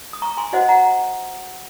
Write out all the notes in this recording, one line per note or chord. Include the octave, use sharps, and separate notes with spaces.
D#6
A#5 C#6
G#5 C6
F#4 C5 D#5 F#5
F#5 A#5